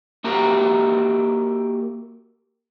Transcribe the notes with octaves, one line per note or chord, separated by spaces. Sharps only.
A#3 F#4 G4 A#4 E5 A#5